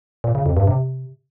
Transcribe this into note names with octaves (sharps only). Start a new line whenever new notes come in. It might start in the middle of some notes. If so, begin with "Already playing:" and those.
A#2
C#3
F2
G2
C3